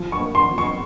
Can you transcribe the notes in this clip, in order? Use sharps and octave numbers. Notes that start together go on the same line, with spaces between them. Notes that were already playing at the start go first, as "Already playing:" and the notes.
Already playing: F3
C#6
A#3
C6
F3
C#6